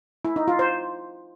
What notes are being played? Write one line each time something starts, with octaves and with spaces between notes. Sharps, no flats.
E4
D#4
F4
C5